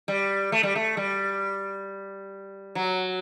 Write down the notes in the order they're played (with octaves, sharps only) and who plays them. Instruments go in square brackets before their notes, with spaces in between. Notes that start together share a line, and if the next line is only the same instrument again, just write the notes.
[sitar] G3
A3
G3
A3
G3
F#3